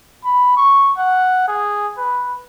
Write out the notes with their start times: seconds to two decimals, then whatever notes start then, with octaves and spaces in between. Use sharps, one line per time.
0.24 B5
0.57 C#6
0.98 F#5
1.48 G#4
1.98 B4